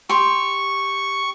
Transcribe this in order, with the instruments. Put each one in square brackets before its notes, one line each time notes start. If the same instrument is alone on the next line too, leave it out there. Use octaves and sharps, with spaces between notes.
[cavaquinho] G4 C6 [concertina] C#6